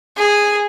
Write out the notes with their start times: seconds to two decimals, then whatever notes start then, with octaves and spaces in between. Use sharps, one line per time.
0.17 G#4